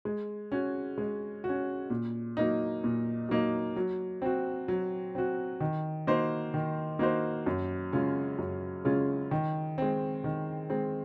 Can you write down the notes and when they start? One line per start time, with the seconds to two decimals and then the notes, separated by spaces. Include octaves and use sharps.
0.05 G#3
0.52 C#4 F#4
0.98 G#3
1.44 F#4
1.49 C#4
1.90 A#2
2.37 F#3 A#3 D#4
2.84 A#2
3.29 F#3 A#3 D#4
3.76 F#3
4.22 C4 F#4
4.68 F#3
5.15 C4 F#4
5.60 D#3
6.07 A#3 D#4 F#4 C5
6.54 D#3
6.99 A#3 D#4 F#4 C5
7.47 F#2
7.93 C#3 G#3 C#4 F4
8.39 F#2
8.85 C#3 G#3 C#4 F4
9.31 D#3
9.78 G#3 C4
10.24 D#3
10.70 G#3 C4